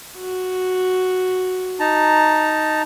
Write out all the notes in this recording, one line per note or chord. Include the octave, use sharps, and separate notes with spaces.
F#4
D#4 A5 A#5